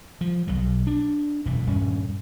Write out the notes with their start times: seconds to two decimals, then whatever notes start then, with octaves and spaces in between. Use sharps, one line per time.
0.21 F3
0.48 B1 B2 F#3
0.87 D4
1.46 E1 F#2 A#2
1.67 D#1 G2 C#4